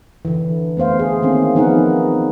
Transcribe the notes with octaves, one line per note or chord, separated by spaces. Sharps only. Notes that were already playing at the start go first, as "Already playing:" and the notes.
D3 E3
A3 B3 C5 F5
G#4
D#3 A#3 C4 C#4
F3 B3 D#4 G#4 A#4 F#5